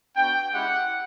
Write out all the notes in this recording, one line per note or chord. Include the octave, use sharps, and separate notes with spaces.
B3 D4 F#4 G5
G#3 C#4 E4 G4 F#5